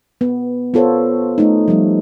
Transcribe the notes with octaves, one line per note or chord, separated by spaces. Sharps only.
B3
B3 F4 A4 C5 C#5
A3 D#4
F3 G3